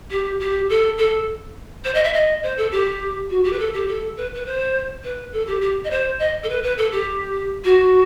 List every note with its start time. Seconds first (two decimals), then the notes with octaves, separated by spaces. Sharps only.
0.10 G4
0.40 G4
0.69 A4
0.98 A4
1.84 C5
1.94 D#5
2.04 E5
2.13 D#5
2.43 C5
2.57 A4
2.71 G4
3.30 F#4
3.44 G4
3.52 B4
3.59 A4
3.74 G4
3.88 A4
4.16 B4
4.34 B4
4.45 C5
5.04 B4
5.32 A4
5.47 G4
5.61 G4
5.84 D#5
5.90 C5
6.19 D#5
6.43 A4
6.49 B4
6.63 B4
6.77 A4
6.92 G4
7.64 F#4